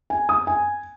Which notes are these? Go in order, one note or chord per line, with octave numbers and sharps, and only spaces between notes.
G#5
D#6
G#5